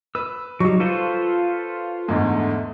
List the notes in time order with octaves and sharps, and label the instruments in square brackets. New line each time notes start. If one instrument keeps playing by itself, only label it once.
[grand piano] B4 [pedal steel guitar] E6
[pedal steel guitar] F#3 G3 [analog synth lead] D#4 [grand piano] C#6
[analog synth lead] F4 [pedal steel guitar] A4 B4 C5
[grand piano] E2 G#2 D3 [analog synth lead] A3